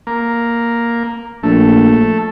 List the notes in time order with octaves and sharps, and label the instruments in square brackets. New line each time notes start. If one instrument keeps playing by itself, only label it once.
[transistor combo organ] A#3
[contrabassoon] A#1 [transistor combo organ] A3